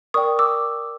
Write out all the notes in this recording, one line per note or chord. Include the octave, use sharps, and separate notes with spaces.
A#4 D5 G5 C#6 D#6
D6 E6